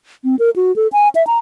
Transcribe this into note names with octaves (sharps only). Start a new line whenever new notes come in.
C4
A#4
F#4
A4
G#5
E5
A#5